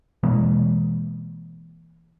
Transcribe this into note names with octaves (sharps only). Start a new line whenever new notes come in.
B2 E3 G#3 A#3